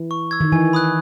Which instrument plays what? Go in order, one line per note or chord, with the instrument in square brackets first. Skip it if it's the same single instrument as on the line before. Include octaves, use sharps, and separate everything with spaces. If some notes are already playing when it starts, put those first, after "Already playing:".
Already playing: [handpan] E3
[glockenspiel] C#6
E6 G#6
[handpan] D#3
[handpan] E3 [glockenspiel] G#5
[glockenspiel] B5 D#6 F#6